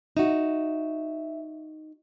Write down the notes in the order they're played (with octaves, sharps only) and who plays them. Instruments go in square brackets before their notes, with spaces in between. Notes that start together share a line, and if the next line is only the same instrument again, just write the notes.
[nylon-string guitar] D#4 F#4 [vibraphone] E5